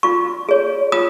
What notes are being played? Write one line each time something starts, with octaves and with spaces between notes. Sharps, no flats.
F4 C#6
G#4 C#5
F4 D#6